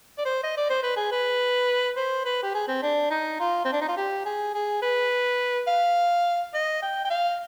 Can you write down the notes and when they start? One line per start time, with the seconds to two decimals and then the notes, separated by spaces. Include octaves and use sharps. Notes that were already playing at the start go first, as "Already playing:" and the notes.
0.18 D5
0.25 C5
0.44 D#5
0.57 D5
0.70 C5
0.83 B4
0.96 G#4
1.12 B4
1.96 C5
2.25 B4
2.43 G4
2.54 G#4
2.68 C4
2.82 D4
3.10 D#4
3.40 F4
3.64 C4
3.73 D4
3.81 D#4
3.88 F4
3.97 G4
4.25 G#4
4.54 G#4
4.82 B4
5.67 F5
6.54 D#5
6.82 G5
7.05 G5
7.10 F5